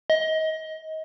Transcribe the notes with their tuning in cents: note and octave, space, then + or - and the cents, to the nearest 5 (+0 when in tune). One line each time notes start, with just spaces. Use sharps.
D#5 +25